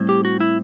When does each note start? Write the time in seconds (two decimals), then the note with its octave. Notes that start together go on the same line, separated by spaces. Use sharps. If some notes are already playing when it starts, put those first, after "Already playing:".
Already playing: A2 G3 C4 E4
0.09 G4
0.25 F#4
0.40 E4